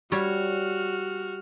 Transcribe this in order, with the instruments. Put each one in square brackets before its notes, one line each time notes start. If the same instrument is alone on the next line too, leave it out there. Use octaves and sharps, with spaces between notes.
[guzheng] G3 C#5 [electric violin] F#4 F6